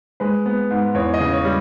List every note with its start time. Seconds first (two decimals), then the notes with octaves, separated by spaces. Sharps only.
0.20 G#3 B4
0.46 B3
0.70 G#2
0.94 E2 C#5
1.14 D#5
1.20 C#3
1.33 C#5
1.45 G3